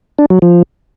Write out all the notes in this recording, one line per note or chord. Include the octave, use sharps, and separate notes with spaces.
D4
F#3
F3